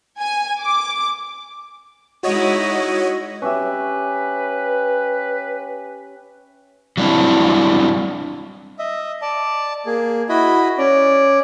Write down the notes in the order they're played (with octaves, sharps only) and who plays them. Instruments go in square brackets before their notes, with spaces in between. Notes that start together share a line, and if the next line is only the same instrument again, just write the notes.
[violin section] G#5
D6
[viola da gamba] G#3 D#4 E4 [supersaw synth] F#4 C#5 D#5
[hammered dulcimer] C#4 G4 E5 [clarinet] B4
[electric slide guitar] F#3 G3 C4 D4 E4
[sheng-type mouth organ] D#5 E5
D5 A5
A#3 G#4
E4 F#4 D#5 B5
C#4 D5